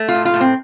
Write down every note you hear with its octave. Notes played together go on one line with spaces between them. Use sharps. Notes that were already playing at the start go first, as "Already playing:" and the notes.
Already playing: A3
F4
A2
F4
A2 A3
C4